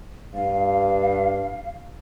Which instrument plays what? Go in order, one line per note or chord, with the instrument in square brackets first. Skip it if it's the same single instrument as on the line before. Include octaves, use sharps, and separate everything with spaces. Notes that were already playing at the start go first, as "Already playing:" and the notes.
[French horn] G2 [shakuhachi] F5